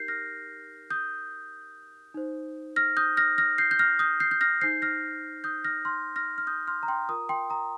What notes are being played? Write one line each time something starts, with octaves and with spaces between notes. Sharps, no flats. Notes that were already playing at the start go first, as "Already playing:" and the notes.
Already playing: D#4 G4 A#4 G6 C7
F6 A#6
D#6 G6
D#4 C5
F6 A#6
D#6 G6
F6 A#6
F6 A#6
G6 C7
G6
F6 A#6
D#6 G6
G6 C7
G6
F6 A#6
D#4 C5 G6 C7
F6 A#6
D#6 G6
F6 A#6
C6 F6
F6 A#6
F6
D#6 G6
C6 F6
A#5
G5 C6
F4 A#4 A#5 D#6
G5 C6
A#5 D#6